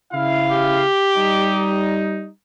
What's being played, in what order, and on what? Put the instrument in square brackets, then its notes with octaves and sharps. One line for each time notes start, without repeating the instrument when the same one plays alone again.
[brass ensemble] C#3 E4 F5
[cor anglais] G4
[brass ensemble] G3 D#4